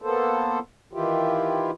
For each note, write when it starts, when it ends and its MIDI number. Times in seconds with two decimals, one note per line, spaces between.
0.02 0.59 58
0.02 0.59 59
0.02 0.59 69
0.02 0.59 72
0.93 1.71 51
0.93 1.71 52
0.93 1.71 64
0.93 1.71 65
0.93 1.71 67